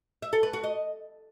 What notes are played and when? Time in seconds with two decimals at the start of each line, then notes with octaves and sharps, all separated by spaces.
0.22 E5
0.33 A4
0.43 B4
0.53 F#4
0.64 D#5